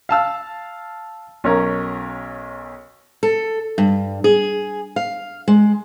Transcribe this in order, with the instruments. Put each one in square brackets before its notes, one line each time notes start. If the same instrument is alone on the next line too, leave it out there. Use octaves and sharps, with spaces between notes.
[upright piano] F5 A5 E6 F6
B1 C#4 A#4
[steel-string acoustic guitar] A4
G2
G#4
F5
G#3